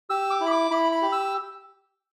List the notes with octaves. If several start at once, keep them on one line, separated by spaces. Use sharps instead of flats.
G4 E6
D6
E4
B5
D6
E4 B5
B5
G4
E6